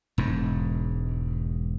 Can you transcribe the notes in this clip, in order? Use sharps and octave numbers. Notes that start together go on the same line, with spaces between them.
E1 G#2